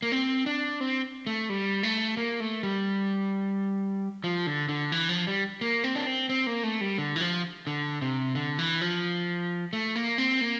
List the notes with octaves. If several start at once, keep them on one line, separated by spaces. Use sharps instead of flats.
A#3
C4
D4
C4
A3
G3
A3
A#3
A3
G3
F3
D3
D3
E3
F3
G3
A#3
C4
D4
C4
C4
A#3
A3
G3
D3
E3
F3
D3
C3
D3
E3
F3
A3
A#3
C4
A#3